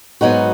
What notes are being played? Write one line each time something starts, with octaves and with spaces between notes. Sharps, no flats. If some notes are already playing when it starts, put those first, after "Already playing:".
G#2 F#3 B3 D#4 F#4